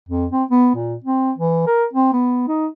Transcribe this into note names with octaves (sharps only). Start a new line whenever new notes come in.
F2
C4
B3
A#2
C4
E3
A#4
C4
B3
D#4